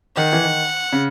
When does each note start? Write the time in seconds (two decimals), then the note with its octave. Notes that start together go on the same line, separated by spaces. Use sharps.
0.17 D#3 F#5
0.33 E3
0.43 D#3
0.92 C#3